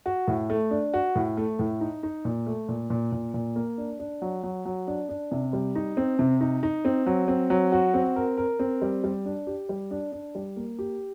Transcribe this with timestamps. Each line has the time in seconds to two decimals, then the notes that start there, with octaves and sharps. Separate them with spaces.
0.06 F#4
0.28 A2
0.50 A3
0.71 D4
0.94 F#4
1.15 A2
1.37 A3
1.59 A2
1.81 D#4
2.03 D#4
2.25 A#2
2.46 A3
2.69 A#2
2.90 A#2
3.12 A#2
3.34 A#2
3.56 A#3
3.78 D4
3.99 D4
4.22 F#3
4.43 F#3
4.65 F#3
4.87 D4
5.09 D4
5.31 C3
5.53 G3
5.75 D#4
5.97 C4
6.19 C3
6.41 D#4
6.63 D#4
6.85 C4
7.07 F#3
7.28 C4
7.50 F#3
7.72 F#4
7.94 C4
8.16 A#4
8.37 A#4
8.59 C4
8.82 G3
9.04 G3
9.25 D4
9.47 G4
9.69 G3
9.91 D4
10.12 D4
10.35 G3
10.56 A#3
10.79 G4